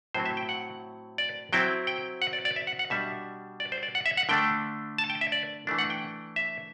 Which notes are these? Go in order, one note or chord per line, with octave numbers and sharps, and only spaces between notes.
A2 F#3 C4 E4 C5
E5
G5
F#5
D5
F#3 C4 E4 G5
G5
F#5
D5
D5
E5
F#5
F#5
B2 G3 D4 E5
D5
C5
D5
F#5
E5
F#5
D3 A3 D4 G5
A5
G5
E5
D5
E3 A3 D4
F#5
G5
E5